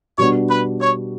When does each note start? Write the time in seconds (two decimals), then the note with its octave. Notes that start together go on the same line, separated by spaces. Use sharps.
0.18 B2 G3 B3 D4 F#4 C#5
0.50 B4
0.81 C#5